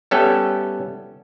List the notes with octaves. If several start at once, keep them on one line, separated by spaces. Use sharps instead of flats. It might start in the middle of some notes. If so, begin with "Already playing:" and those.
G3 B3 C#4 A4 E5 G5